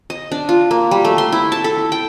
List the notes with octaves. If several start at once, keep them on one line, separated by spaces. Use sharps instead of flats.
D#5
D4
F4
A#3
G3
A3
C6
E4
A5
A4
G5